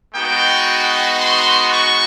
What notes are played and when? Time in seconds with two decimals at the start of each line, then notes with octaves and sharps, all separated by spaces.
0.14 G#3 B3 D#4 F#4 G5
1.20 C6
1.72 C#6